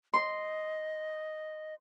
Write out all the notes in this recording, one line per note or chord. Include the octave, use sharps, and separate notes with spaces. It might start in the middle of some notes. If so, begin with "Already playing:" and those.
D#5 C6